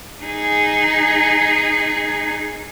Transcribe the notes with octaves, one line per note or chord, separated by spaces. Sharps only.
D#4 G#4